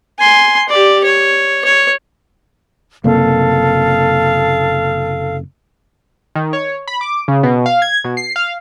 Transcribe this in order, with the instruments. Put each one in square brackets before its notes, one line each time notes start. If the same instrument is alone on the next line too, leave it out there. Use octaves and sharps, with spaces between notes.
[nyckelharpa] G#5 C6
G4 D5
C#5
C#5
[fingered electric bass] F#1 C3 A#3 [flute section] A4 F5
[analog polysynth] D#3
C#5
B5
D6
C#3
B2
F5
G#6
B2
C7
F5